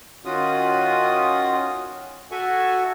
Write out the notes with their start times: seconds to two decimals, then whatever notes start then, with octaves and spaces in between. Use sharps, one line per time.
0.25 D#3 C#4 F4 F#4 D#6
2.32 F#4 A4 E5 G#5 C#6